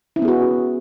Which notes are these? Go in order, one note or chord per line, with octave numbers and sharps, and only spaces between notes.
B3 C#4 E4 F#4 G#4